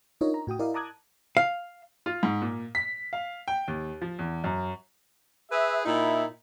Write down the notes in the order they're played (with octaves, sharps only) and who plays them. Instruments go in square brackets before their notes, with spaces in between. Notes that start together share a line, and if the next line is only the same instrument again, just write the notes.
[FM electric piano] D4 D#4 F4 A#4 C#5 D#5
A#5
A2 F#4 G5 D#6
E4 A#4 D5 D#5 F5
A5 A#5 D6 D#6 F#6 G#6
[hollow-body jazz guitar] F5
[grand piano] F4
G#2
A#2
B6
F5
G5
D#2
F3
E2
F#2
[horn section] G#4 B4 E5
A#2 D#4 E4